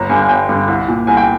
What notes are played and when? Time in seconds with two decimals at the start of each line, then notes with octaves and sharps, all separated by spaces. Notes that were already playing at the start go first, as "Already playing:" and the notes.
Already playing: G1 A#5
0.09 G2 D3 G#5
0.21 G#5
0.29 G1 G5
0.49 G2 D3
0.68 C2
0.88 A#2
1.07 C2 G#5
1.17 G5